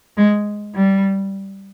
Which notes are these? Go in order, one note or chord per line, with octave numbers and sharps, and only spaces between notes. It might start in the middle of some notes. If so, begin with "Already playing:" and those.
G#3
G3